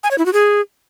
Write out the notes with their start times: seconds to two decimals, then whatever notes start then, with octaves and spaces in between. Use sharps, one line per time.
0.03 G#5
0.11 C#5
0.18 E4
0.26 F#4
0.33 G#4